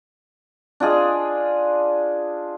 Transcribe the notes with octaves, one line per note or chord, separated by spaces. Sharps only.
D4 F4 G#4 D#5